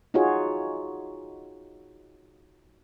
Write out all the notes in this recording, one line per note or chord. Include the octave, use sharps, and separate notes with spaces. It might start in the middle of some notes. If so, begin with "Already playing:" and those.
D#4 F4 F#4 G#4 C#5